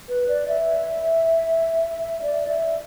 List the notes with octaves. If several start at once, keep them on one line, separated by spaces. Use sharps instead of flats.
B4
D5
E5
D5
E5